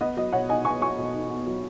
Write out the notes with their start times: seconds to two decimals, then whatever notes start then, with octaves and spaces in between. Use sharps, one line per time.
0.01 B3 D#5
0.17 F#3 D#5
0.32 B2 C#5 F#5
0.49 D#4 D#5 G#5
0.65 B3 G#5 C#6
0.81 F#3 G#5 C#6
0.98 B2
1.14 D#4
1.30 B3
1.46 F#3